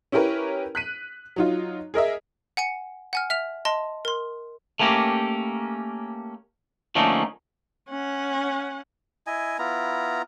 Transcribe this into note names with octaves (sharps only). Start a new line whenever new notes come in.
C#4 E4 G4 A#4 B4 C#5
F#6 B6 D#7
F#3 D#4 F4
G#4 A#4 D#5 E5
F#5 G#5 C#7
F#5 G#5 F6
E5 F6 F7
D#5 A5 C6
A#4 C6
A3 A#3 C#4 G4 A#4
D3 F3 A3 A#3 C#4 D#4
C#4 F#5
E4 D#5 G#5
B3 E4 F4 A#5